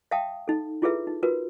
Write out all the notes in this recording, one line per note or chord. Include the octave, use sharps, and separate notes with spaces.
E5 F5 G5 A5 D#6
D#4 A4
E4 F4 G#4 A4 B4 E5
D#4
F4 F#4 A#4 B4